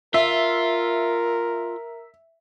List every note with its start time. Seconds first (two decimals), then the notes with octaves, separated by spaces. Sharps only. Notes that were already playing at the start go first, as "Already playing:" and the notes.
0.14 F4 A#4 E5